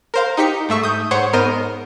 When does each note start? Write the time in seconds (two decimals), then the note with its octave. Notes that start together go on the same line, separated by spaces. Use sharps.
0.14 A#4 C5 F5
0.37 D#4 G4 B6 C#7
0.69 G#2 A3 E5 C#6
0.83 D#6 G6
1.11 G#2 C5 C#5 F#5
1.33 G#2 B3 A#4 C5 D#5 D#7